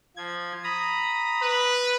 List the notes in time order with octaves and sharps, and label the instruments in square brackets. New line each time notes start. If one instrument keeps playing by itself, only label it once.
[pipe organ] F3 G#6
A#5 B5 D#6
[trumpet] B4